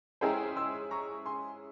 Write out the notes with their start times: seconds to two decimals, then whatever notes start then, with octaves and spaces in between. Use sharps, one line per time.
0.21 G#3 C#4 E4 G#4 C5 G5 A#5
0.56 C6 E6
0.91 A#5 C#6
1.26 G#5 C6